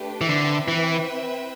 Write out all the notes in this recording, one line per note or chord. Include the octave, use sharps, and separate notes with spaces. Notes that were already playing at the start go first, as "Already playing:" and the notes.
Already playing: A3 D4 G4 B4
E3
D3 C4 E4 B4 E5 G5
E3